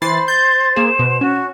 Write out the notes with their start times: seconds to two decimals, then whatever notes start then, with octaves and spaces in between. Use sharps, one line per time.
0.02 E3 C5 B5 A6 C7
0.28 G6 A6
0.76 A#3 G#4 E7
0.99 B2
1.21 C#4 F#4